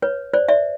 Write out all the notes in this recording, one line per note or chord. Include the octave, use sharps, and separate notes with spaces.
B4 C#5
C5 D5
D5 E5